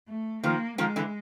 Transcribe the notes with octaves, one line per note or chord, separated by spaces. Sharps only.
A3
D#3 F3 A#3
D#3 F3 G#3
D3 E3